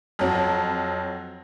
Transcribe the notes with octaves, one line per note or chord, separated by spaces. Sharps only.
F2 F#3